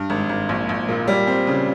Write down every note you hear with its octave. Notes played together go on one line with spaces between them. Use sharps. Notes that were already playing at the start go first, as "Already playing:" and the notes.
Already playing: G2
G#1
G#1
A#1
A#1
A#2
G3
C4
C#3